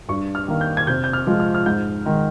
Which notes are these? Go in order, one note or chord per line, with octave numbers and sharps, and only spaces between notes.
G2 C#6
F6
D#3 A#3
G6
G#6
C3 G6
G6
F6
F3 G#3 C4
F6
F6
G#2 G6
D#3 G#3